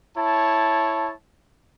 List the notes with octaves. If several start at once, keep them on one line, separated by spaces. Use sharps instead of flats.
E4 C#5 A5